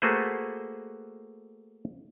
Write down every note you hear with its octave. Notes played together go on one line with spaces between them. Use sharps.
A3 A#3 F#4 G#4 B4 C5